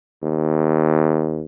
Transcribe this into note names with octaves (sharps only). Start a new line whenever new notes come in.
D#2